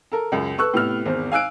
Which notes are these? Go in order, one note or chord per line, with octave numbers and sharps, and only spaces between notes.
A4 A#4
C#2 F#2
A4 B4 C#6 E6 F#6
A2 C3 B3 E6 F6
G#1 E2 C5
F5 G#5 E6 F#6 D7